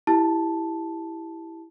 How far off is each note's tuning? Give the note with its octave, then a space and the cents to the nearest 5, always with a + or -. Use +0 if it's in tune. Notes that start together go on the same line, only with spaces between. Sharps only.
E4 +0 G4 +0 A5 +0